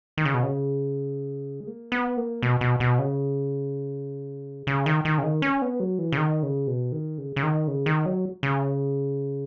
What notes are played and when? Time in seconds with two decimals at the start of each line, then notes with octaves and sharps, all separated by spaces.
0.18 D#3
0.25 C#3
0.34 B2
0.43 C#3
1.60 G#3
1.67 A#3
1.92 B3
2.17 A#3
2.43 B2
2.61 B2
2.80 B2
2.99 C#3
4.67 C#3
4.86 D#3
5.05 D#3
5.18 C#3
5.23 D#3
5.42 C#4
5.62 B3
5.80 F#3
5.99 E3
6.12 C#3
6.17 D#3
6.43 C#3
6.67 B2
6.92 D#3
7.18 C#3
7.36 C#3
7.43 D#3
7.68 C#3
7.86 D#3
8.06 F#3
8.43 C#3